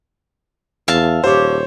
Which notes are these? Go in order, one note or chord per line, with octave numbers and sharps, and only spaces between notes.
E2 E5 F5 A5
D#1 G4 C5 C#5